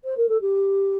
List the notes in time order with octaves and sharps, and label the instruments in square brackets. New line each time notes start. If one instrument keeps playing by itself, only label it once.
[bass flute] C5
A#4
A4
G4